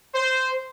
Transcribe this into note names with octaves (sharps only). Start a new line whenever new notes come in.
C5